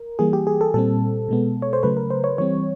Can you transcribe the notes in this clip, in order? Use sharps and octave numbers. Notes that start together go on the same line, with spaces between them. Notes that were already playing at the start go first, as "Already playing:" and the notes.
Already playing: A#4
E3 G3 A#3 G#4
G4
G#4
A4
A#2 G3 C4 A4
B2 G#3 B3
C#5
C5
C#3 F#3 A3 B4
A#4
C5
C#5
E3 G3 C4 C#5